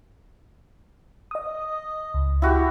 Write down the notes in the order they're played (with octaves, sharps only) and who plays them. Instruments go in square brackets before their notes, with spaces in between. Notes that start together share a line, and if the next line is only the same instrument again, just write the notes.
[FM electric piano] D#5 D#6
C#2
[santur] E4 F#4 G4